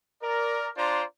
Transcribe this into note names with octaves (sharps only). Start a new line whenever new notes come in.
A#4 D5
D4 F4 C5 D5 A#5 C6